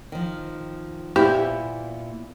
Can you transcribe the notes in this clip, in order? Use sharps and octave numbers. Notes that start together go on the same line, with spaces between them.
D#3 F3
A#2 B3 E4 G4 C5